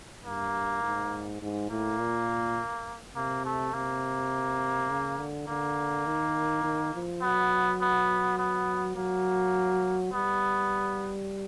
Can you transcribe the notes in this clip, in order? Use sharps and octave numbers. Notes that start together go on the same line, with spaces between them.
G2 A#3
G#2
G#2
A2 A#3
A#2
C3 A#3
A3
C3 A#3
C#3
D3
D3 A#3
D#3
D#3
F3
F#3 B3
B3
B3
F#3 A#3
G3 B3